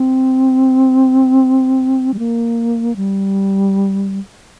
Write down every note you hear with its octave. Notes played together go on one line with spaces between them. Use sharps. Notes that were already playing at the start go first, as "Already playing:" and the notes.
Already playing: C4
G3
A#3
G3